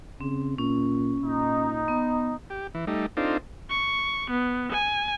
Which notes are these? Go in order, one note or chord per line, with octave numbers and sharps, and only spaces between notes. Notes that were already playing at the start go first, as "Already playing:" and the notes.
C#3 C4
A#2 C#4
A#2 D#4
B3
G4
E3
G3 A3 D#4
C4 D4 D#4 F4 A4
C#6
B3
G#5